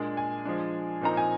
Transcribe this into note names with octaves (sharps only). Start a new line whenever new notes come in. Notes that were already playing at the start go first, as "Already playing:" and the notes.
Already playing: A#2 G#3 D4
G#5
F3 G#3 D4
A#2 F3 C4 D#4 A#5
G#5